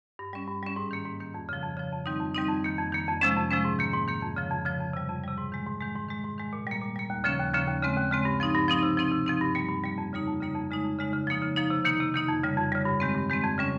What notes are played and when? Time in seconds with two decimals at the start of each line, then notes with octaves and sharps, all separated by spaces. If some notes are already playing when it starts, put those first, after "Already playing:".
0.19 G2
0.33 G3 C#4
0.47 G2
0.63 G3 C#4
0.76 G#2
0.91 D#3 A#3
1.05 G#2
1.20 D#3 A#3
1.34 F2
1.49 C#3 F3
1.63 F2
1.77 C#3 F3
1.92 F2
2.06 D#3 G3 C4 D#4
2.20 F2
2.35 D#3 G3 C4 D#4
2.49 F2
2.64 D#3 A#3
2.78 F2
2.93 D#3 A#3
3.08 F2
3.21 C3 F3 G#3 C#4
3.36 F2
3.50 C3 F3 G#3 C#4
3.65 G#2
3.79 D#3 A#3
3.93 G#2
4.08 D#3 A#3
4.22 F2
4.36 C#3 F3
4.51 F2
4.65 C#3 F3
4.80 F2
4.94 C3 G3
5.09 F2
5.24 C3 G3
5.37 G#2
5.52 D#3 G#3
5.67 G#2
5.80 D#3 G#3
5.96 G#2
6.09 D#3 G#3
6.24 G#2
6.38 D#3 G#3
6.53 A#2
6.67 G3 A#3
6.82 A#2
6.96 G3 A#3
7.10 D#2
7.24 C#3 F3 A#3 C#4
7.39 D#2
7.53 C#3 F3 A#3 C#4
7.67 D#2
7.83 C#3 G#3 C4
7.97 D#2
8.11 C#3 G#3 C4
8.25 G2
8.40 F3 C4 D#4
8.54 G2
8.68 F3 C4 D#4
8.83 C3
8.97 F3 C4 D#4
9.12 C3
9.26 F3 C4 D#4
9.41 G2
9.55 G3 A#3
9.69 G2
9.84 G3 A#3
9.98 F2
10.13 C#3 G3 A#3 D#4
10.27 F2
10.41 C#3 G3 A#3 D#4
10.55 F2
10.71 C#3 G#3 D#4
10.84 F2
10.99 C#3 G#3 D#4
11.13 C#3
11.27 F3 A#3 D#4
11.42 C#3
11.56 F3 A#3 D#4
11.70 C3
11.85 D#3 A#3 D#4
12.00 C3
12.14 D#3 A#3 D#4
12.28 F2
12.43 C#3 G3
12.58 F2
12.72 C#3 G3
12.85 G2
13.00 D#3 G#3 C4
13.15 G2
13.30 D#3 G#3 C4
13.44 F2
13.58 C#3 G3 C#4